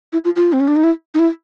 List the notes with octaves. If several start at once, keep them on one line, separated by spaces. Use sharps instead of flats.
E4
F4
F4
C4
C#4
D4
D#4
E4
D#4
E4